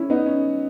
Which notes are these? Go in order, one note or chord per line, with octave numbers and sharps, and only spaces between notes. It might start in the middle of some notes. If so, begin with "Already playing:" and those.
Already playing: C#4 E4
B3 D#4
C#4